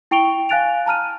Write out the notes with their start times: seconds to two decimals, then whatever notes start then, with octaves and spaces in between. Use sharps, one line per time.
0.11 E4 G5 C#6 D7 F7 G7
0.49 F5 G#5 F#6 A6 D7 F7
0.86 A5 A#5 F6 D#7